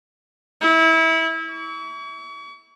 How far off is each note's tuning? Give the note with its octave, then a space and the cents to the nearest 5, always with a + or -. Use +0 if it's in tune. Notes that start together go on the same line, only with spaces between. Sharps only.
E4 -25
C#6 +40